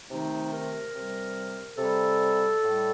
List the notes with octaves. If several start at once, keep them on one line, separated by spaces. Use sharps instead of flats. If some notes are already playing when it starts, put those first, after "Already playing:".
C3 D#3 A3 D#4
A#4
C3 G3
C3 G3 A4
A2 G3